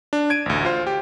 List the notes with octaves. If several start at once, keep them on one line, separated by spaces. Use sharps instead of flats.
D4
G#6 D7 D#7
A1 D2
F4 C5
G4